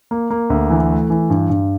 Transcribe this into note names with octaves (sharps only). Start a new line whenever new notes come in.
A#3
A#3
D2
E3
A3
E3
G2
G2